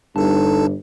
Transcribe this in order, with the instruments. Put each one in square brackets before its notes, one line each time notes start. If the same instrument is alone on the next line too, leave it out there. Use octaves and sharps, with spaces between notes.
[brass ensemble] G1 G2 [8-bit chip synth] D#4 A4 A5